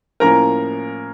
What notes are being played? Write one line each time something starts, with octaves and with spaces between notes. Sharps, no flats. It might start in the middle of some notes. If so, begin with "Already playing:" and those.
A2 F3 A#3 C#4 A#4 A#5